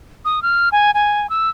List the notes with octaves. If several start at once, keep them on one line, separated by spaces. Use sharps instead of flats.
D#6
F6
G#5
G#5
E6